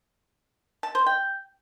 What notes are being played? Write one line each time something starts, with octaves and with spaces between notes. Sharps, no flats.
A5
C5
G5